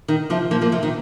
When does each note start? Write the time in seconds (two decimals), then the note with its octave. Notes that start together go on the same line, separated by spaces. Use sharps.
0.08 D#3
0.30 C3 F3
0.51 F3 A#3
0.61 F3 A#3
0.72 C3 F3
0.83 D#3